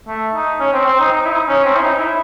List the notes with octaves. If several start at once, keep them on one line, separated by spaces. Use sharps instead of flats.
A3
D#4
C#4
C4
C4
D#4
D#4
E4
D#4
C#4
C4
E4
D#4
E4